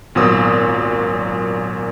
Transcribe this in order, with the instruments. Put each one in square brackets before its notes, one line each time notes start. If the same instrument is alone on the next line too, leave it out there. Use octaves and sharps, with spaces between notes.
[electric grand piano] G#1 A#2 F#3 B3 D#6 E6